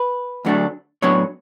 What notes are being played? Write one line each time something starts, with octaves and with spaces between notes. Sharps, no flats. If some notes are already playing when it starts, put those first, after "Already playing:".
Already playing: B4
D2 D3 F#3 A3 D4
A2 F#3 B3 D4 C#5